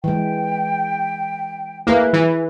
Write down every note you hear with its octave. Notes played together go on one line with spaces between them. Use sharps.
E3 G#3 G5
A#3 E4 G#4 B4
E3